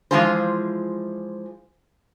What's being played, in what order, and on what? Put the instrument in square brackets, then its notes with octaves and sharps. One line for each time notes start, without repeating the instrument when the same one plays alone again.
[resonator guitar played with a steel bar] E3 F3 G#3 F4 G#4 C5